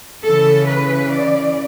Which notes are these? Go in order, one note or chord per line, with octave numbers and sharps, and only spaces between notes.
C#3 E3 A4
B4
D5